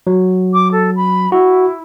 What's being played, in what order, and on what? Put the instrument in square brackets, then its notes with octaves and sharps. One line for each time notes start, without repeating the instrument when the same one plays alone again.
[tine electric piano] F#3
[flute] D6
A4
B5
[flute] E4 [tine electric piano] F#4